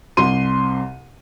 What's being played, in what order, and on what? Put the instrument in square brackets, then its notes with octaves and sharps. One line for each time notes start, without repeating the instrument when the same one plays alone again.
[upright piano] C2 C3 C6 D#7